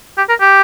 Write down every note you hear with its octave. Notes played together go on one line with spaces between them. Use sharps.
G4
A#4
G4